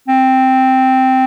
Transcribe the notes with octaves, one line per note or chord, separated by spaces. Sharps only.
C4